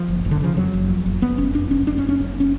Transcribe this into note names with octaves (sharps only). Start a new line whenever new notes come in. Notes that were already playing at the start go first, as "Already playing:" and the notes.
Already playing: F3
F#1
F#1
D3
C#3 F3
F2 F#3
F#1
F2
F#1
F#1 B3
F#1 C#4
F2 D4
F#1 C#4
F#1 D4
C#4
F#1
C#4
F#1
C#4